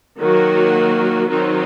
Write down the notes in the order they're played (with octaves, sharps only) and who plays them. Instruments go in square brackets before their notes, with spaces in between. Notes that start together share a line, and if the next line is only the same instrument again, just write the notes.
[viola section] D#3 F#3 A#3 F#4
D#3 F#3 C4 D#4